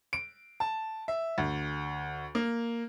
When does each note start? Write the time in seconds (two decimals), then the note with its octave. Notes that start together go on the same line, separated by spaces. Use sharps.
0.13 D7
0.60 A5
1.08 E5
1.38 D2
2.35 A#3